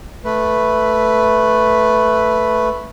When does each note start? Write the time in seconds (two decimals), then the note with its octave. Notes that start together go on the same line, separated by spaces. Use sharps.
0.25 A3 B4